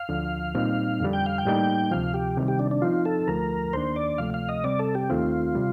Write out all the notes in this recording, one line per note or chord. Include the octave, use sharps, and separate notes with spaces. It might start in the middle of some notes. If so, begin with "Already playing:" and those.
Already playing: F5
D2 D3 F3
A#2 G3 C4 D#4
F2 D3 G3
G5
F5
G5
A2 G3 A#3 D#4
D2 C3 F3 F5
G4
C3 D#3 G3
G4
D4
D4
F3 C4 D#4 F4
A4
D2 D3 F3 A3 A#4
D#2 D#3 A#3 D4 C5
D5
D2 C3 F3 A3 F5
F5
D#5
C3 G3 C4 D5
A4
G4
D#2 D#3 A3 C4 F4
C3 G3